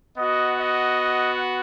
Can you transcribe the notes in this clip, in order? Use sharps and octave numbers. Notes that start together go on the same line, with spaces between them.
B3 F#4 D#5
D#5